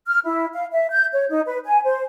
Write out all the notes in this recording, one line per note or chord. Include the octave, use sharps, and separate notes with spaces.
F6
E4
F5
E5
G6
C#5
D#4
B4
G#5
C5